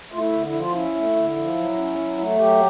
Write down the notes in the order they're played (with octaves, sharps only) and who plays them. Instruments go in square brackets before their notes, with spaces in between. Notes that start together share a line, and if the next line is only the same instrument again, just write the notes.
[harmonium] A3 F4
E4
D3
E4
F3
F4
C#4 E4
A3
D3
F3
F#3
C#4
F#3
A3
F#3 G4